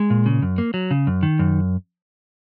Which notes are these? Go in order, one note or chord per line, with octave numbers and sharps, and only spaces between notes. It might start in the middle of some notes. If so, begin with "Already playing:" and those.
Already playing: G#3
A#2
C#3
F#2
A#3
F#3
C#3
F#2
D#3
F#2